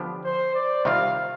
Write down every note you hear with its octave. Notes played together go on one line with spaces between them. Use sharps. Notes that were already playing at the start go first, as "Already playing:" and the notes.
Already playing: D3 F3 B3 D4 G4
C5
D5
C3 D#3 G3 C4 F4 F5